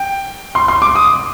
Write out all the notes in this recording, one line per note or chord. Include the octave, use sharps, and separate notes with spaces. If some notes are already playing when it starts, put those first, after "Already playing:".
Already playing: G5
C6
C6
D6
D#6